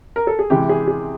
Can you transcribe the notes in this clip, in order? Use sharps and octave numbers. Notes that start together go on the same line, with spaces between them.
A#4
A4
G#4
C3 E3 G#3 G4
G#4
G#4